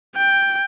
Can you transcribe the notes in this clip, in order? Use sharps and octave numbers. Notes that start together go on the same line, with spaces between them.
G5